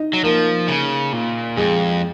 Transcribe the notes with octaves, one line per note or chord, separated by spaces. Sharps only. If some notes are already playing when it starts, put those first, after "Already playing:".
Already playing: D#4 D#5
F#3
F3 A#3 A#4
C#3
A#2
F2 G#3 G#4